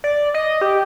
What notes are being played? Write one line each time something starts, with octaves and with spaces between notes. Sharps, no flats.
D5
D#5
G4